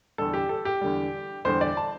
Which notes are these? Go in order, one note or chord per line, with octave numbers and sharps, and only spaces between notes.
E2 D3 G3 A4
G4
A4
G4
E2 D3 G3
E2 D3 G3 C5
D5
A5